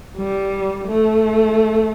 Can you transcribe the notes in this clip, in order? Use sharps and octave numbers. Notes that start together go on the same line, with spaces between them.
G3
A3